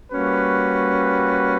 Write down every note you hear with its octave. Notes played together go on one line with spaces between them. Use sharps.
G3 A#3 C#4 F#4 B4